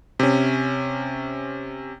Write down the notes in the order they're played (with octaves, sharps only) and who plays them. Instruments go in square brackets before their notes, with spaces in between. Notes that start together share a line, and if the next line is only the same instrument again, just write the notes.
[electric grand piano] C3 C#4